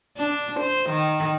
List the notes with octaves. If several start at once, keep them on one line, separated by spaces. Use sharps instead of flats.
D4
C5
D#3